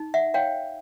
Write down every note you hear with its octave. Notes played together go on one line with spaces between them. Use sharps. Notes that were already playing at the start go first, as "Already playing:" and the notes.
Already playing: D#4
E5 F#5
C#5 F5 G5